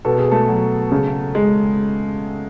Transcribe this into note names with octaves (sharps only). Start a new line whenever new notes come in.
B2 A4
G#4
A3 A4
F#3
C#3
G#3